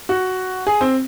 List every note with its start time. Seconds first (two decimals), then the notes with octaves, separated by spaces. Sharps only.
0.09 F#4
0.67 G#4
0.81 C4